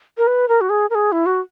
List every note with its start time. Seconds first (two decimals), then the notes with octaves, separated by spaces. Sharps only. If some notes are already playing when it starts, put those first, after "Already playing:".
0.18 A#4
0.27 B4
0.48 A#4
0.61 F#4
0.70 G#4
0.90 A#4
0.95 G#4
1.12 E4
1.26 F#4